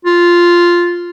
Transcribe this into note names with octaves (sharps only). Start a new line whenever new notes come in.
F4